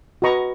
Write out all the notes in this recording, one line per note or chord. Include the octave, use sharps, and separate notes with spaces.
F#4 B4 D#5 A#5 C#6